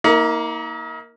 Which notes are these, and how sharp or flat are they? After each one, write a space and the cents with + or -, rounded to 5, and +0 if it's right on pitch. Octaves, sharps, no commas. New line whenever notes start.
A#3 +0 D#4 +45